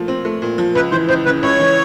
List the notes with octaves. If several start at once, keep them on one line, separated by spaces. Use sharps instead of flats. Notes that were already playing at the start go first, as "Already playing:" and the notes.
Already playing: A#2 F3 A3
C4
A3
A#2
F3
C#2 B4
E3 C5
C#2 C5
C#3 B4
C#2 C#5
E3